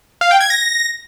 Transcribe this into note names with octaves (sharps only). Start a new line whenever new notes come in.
F5
G5
G#6
A#6